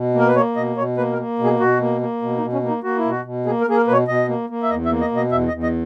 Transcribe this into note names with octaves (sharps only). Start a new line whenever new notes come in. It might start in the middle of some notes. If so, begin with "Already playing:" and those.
Already playing: B2
A#3
A#4
B4
A#3 C#5
B2 D#5
B2 C#5
A#3 B4
A#4
A#3
B2
G#4
B2 F#4
A#3
A#3
B2
D#4
B2
C#4
A#3
D#4
A#3 F#4
E4
B2
F#4
B2
A#3 G#4
A#4
A#3 G#4
A#4
B2 B4
C#5
B2 D#5
A#3
A#3
E5
E2 D#5
E5
A#3
D#5
B2
D#5
E2 E5
D#5
E2
D#5